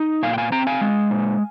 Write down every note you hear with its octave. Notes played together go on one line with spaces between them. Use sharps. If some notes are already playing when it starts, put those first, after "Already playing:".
Already playing: D#4
A#2 F5 G#5
G5
F5 G#5
C4 G5 A#5
F5 G#5
G#3
A#2